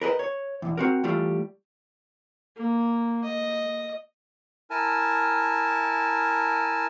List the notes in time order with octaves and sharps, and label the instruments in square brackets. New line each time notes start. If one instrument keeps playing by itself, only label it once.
[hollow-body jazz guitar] A#4 B4 D#5
C#5
B1 E2
C4 F#4 A#4
E3 G3 A3 F4
[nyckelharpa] A#3
D#5
[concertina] E4 A#4 G#5 A5